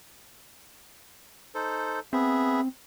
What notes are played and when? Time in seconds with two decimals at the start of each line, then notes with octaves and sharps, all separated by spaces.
1.55 D#4 A4 C5
2.13 B3 C4 G#4 E5